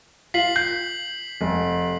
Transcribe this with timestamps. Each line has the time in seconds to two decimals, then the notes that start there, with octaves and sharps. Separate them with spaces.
0.34 F4 B6 C7 F#7
0.56 G6 C7
1.41 F1